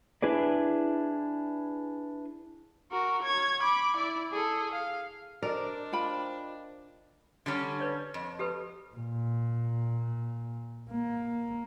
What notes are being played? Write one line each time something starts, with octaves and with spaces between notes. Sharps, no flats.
D4 E4 G#4 B4 D5
F#4 A#4
C#5 G#6
B5 D6
E4 D5
G#4 A4
F5
D4 A#4 C5 D5 D#5
F4 G5 B5
D3 G3 C#4
B4 C#5 D5
F2
G4 A4 B4
A#2
A#3